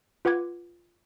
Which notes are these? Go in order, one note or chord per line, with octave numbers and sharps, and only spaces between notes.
F4 B4 F#5 D6 G#6